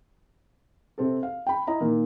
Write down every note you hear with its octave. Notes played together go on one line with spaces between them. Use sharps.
C3 C4 A4
F5
G5 B5
E4 D#5 A#5
A#2 D#3 A#3